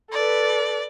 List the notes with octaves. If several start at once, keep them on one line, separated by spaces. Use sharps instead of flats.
A4 B4 D5